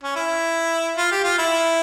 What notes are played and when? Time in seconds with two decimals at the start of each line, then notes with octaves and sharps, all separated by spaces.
0.03 C#4
0.16 E4
0.97 F4
1.11 G4
1.24 F4
1.38 E4